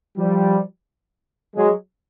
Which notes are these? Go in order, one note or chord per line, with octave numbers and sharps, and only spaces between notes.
F3 G3
F#3 G#3